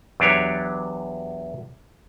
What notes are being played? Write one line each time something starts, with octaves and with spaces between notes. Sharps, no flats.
E2 F#3 D4 G4 C#5